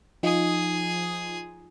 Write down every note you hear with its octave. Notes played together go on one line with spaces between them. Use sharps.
F3 D#4 F4 G#4 D#6